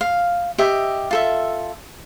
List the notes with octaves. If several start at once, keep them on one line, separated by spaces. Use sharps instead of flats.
F5
G4 D#5 E5
F4 A4 E5